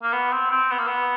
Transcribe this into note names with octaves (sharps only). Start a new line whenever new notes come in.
A#3
B3
C4
C4
B3
A#3
B3